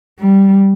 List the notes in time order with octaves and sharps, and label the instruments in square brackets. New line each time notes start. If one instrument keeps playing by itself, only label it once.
[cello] G3